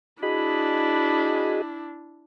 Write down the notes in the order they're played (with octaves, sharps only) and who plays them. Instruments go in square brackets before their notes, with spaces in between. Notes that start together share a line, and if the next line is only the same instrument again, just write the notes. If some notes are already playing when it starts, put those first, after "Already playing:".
[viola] D4 [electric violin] E4 [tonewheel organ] F#4 G#4 D#5 [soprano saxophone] B5